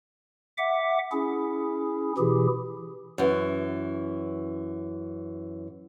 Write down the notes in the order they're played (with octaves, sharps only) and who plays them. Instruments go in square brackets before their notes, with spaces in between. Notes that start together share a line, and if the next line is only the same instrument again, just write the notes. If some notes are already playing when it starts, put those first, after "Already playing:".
[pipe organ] E5 F#5 D6
C#4 E4 G#4
B2 E3 E4 G4 G#4
[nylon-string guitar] F#2 E3